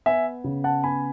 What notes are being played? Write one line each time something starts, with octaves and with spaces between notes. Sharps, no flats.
B3 E5 G#5
C#3
F#5 A5
B3 G#5 B5